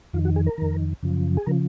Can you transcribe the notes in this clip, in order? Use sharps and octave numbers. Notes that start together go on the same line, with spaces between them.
F2 D#3 F4
F#4
G#4
A#4
F2 D#3
F#2 C#3 F3
G#4
C#3 F3 A#4